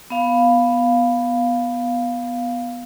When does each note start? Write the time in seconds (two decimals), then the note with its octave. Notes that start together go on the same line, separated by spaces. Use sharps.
0.10 B3 F5